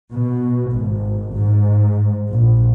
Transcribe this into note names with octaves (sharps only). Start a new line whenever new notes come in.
B2
G#1
G#2
A#1